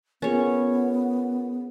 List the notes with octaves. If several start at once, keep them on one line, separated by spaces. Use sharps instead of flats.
B3 C#4 F4 G#4 A#4 C#5